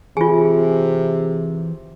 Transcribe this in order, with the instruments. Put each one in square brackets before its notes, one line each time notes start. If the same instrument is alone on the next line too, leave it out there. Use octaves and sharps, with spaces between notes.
[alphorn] C3 [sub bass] E3 [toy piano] F4 G#5 [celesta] G#4